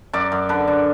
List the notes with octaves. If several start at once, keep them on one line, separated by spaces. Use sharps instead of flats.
F#2 D5
F#2
D3 B4
D3